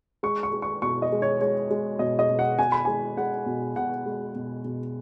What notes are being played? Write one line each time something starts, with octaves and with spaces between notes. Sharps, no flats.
G#3 C#6
C#6
G#3
C#6
B2 C#6
D#5
G#3
C#5
G#3 C#5
G#3
B2 D#5
D#5
B2
F#5
B2 G#5
B5
G#3 G#5
G#3 F#5
B2
B2 F#5
G#3
B2
B2